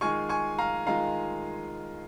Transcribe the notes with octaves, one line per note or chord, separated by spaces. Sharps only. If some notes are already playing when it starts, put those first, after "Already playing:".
D#3 G#3 F4 G#5 C#6
G#5 C#6
F5 A#5
D#3 G#3 F4 F5 A#5